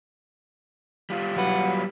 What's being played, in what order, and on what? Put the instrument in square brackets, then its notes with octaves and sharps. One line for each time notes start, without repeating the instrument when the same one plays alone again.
[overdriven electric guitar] G3 F4
[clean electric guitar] F#3 B4 [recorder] F#5